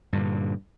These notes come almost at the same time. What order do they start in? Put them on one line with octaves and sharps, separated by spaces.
G2 D3 A#2